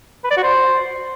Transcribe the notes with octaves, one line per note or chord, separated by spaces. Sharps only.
B4
D5
F#4
C5